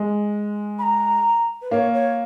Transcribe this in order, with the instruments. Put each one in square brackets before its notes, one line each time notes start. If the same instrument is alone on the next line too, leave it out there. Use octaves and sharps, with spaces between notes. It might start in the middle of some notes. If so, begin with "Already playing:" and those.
Already playing: [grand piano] G#3
[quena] B5
A#5
B4
[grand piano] A#3 [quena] C#5
[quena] C#5